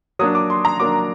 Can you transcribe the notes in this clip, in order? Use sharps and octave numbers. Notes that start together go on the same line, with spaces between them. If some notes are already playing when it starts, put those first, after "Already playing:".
F#3 A#3 D4 D#6
D6
C6
A#5
F#3 A#3 D4 D6